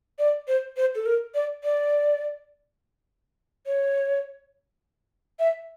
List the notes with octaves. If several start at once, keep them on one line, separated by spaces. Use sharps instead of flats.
D5
C5
C5
A4
A#4
D5
D5
C#5
E5